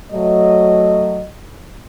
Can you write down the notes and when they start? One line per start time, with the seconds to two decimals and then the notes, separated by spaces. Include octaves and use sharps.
0.12 F#3 A3 D#5